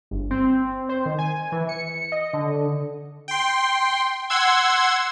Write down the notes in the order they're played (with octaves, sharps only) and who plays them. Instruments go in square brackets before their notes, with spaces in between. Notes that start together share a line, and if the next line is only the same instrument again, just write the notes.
[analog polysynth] G1
C4
C5
D#3
G#5
E3
C#7
D#5
D3
[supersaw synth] G5 C6
F#5 C6 E6 G#6